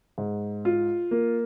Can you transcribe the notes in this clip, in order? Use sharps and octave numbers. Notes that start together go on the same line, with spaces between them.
G#2
F4
A#3